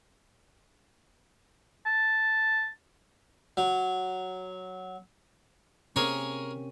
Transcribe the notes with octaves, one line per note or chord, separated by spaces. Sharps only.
A5
F#3
C3 A#3 C#4 G#4 A#4 C#5